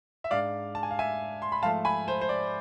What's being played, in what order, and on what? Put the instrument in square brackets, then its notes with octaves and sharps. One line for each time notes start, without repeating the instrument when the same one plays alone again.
[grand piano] E5
G#2 G#3 D4 D5 F5
A5
G#5
F5
E5 G#5
C6
B5
G#2 F3 A3 F5 A5
G#5 B5
C5
C5
D5